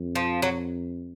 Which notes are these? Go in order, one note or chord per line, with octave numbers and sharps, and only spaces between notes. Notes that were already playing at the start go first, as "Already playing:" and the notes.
Already playing: F2
F3
F#3